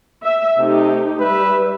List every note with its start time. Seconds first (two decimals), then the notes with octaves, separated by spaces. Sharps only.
0.23 E5
0.58 C3 A3 D#4 G4
1.20 G3 B4 E5